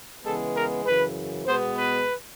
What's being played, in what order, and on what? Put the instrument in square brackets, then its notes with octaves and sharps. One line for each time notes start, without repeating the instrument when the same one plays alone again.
[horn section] C#3 E3 G#3 B3 A4
A#4
F#2 C#3 E3 B4
B2 G#3 B3 C5
B4